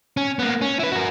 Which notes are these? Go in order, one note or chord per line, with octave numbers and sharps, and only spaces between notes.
C#4
A#3 B3
C#4
E4 B4
F#4 A#4